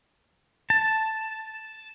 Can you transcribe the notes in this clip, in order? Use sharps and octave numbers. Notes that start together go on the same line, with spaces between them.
A5